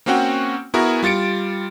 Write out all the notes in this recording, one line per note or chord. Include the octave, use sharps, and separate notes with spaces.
A#3 C4 C#4 F#4 F#5 G5
B3 E4 F#4 G#4 A#4
G3 F4 A6 C#7 D7